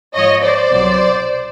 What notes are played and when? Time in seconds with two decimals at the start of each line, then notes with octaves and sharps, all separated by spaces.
0.14 G#2 F3 C#5 D#5
0.42 C5 D5
0.71 C2 B2 F#3